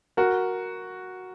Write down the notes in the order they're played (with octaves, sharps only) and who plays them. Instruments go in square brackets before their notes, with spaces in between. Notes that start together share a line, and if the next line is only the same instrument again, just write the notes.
[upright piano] F#4 A#4